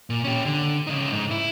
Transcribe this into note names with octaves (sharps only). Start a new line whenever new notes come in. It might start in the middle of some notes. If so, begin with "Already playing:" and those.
A#2
C#4 G4
D3
C#3 D#4
G#2
E4